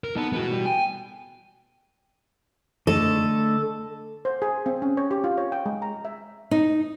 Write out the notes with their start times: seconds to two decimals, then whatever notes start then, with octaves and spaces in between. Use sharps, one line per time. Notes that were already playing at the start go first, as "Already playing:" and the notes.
0.04 A#4
0.16 B3 D#4 A4
0.33 F2 E3 G#3 B3 F#4
0.50 A2 E3 G3
0.66 G5 G#5
2.87 D3 A3 A4 D#5
4.25 C5
4.42 G#4
4.66 C4
4.82 C#4
4.97 C#5
5.11 G4
5.24 F4
5.38 C#5
5.52 G5
5.66 G#3
5.82 A#5
6.05 E5
6.51 D#4